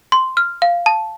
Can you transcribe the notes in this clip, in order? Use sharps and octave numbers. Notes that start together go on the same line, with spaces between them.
C6
F6
F5
A5